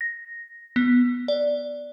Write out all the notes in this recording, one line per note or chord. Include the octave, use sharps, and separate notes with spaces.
A#6
B3
D5